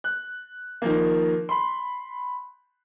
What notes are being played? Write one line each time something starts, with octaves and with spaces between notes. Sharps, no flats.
F#6
D#3 F3 A#3
B5 C6